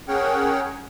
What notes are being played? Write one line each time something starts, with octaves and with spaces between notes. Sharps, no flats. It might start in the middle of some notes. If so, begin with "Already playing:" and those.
C#4 G#4 A#4 C#5 F#5 G5